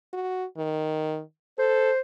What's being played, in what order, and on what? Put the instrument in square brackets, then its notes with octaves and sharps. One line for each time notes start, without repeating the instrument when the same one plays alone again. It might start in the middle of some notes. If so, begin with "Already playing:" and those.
[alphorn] F#4
D#3
[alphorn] A4 [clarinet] C5